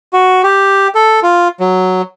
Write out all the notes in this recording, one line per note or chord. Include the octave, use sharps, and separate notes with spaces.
F#4
G4
A4
F4
F#3